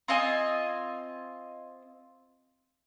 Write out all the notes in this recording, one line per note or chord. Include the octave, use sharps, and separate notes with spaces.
C4 F4 D#5 G#5